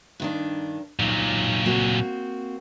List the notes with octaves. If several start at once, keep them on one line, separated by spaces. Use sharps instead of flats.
G2 D#3 D4
A#2 F#3 D#4 F4
A#3 C4 F#4